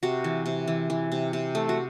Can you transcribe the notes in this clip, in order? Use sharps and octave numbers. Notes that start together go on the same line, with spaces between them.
C3 F#4
E3
C3
E3
E3
C3
C3
A3
F#4